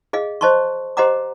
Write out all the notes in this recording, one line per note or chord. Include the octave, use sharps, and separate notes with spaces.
G#4 D#5 F5
C5 D#5 A5 C6 C#6
G4 C5 D#5 F#5 A#5 D6